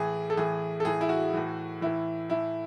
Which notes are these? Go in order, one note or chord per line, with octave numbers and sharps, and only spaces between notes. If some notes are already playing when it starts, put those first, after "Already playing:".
Already playing: A2 E3 G#4
A4
A2 E3 G#4
A4
A2 E3 G#4
E4
F#4
A2 E3
A2 E3 E4
A2 E3 E4